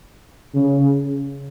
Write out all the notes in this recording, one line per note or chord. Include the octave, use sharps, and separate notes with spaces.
C#3